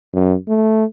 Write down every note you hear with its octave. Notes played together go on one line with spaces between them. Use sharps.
F#2
A3